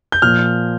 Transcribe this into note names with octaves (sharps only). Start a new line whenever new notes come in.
G6
A#2 F3 F6